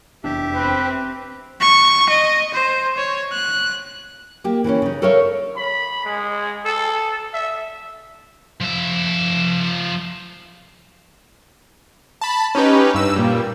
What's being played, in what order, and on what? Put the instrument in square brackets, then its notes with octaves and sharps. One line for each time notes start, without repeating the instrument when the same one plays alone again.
[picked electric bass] F1 E2 D4 [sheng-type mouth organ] G4 E5
[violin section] C4 [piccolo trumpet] B4
[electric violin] C#6
D#5
C5
C#5
F#6
[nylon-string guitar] A#3 G4
E3 A#3 C4 C#4
C#3 D#4
A4 A#4 C#5 E5 F5
[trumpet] B5
G#3
A4
E5
[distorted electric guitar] F3 E5
[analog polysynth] A5 B5
C#4 D#4 G4 B4
G2 E6
A#2 G3